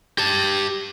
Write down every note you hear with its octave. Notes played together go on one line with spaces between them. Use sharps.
G4 A5